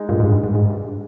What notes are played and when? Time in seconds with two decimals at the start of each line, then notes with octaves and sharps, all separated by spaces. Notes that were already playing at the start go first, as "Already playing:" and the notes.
Already playing: G#3 D#4
0.09 G2 A#2
0.20 G#2
0.32 G2
0.44 G#2
0.55 G#2
0.70 G2